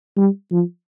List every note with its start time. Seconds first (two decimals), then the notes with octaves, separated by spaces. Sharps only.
0.17 G3
0.51 F3